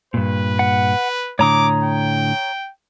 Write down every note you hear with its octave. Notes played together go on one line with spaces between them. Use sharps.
G2 A#2 B4
F#5
A2 D3 C#5 A#5 D6 D#6
G5